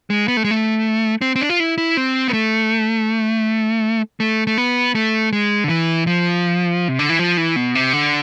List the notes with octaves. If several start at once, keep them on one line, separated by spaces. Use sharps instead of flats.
G#3
B3
A3
G#3
A3
C4
C4
D4
F4
E4
E4
C4
B3
A3
A3
A3
B3
A3
G#3
D3
E3
F3
C3
D3
E3
F3
E3
B2
C3
D3